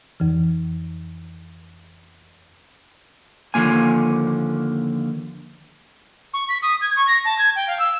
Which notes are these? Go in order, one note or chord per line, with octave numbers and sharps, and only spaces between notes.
F2 E3
D#2 D3 F3 A#3 G#5
C#6
B6
D#6
G#6
C#6
A#6
A5
G#6
G5
F5
E6